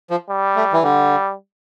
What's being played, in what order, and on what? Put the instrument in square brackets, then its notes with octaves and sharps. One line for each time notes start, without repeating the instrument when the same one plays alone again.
[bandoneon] F3
[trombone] G3
[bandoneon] A3
E3
[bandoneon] D3 [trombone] G3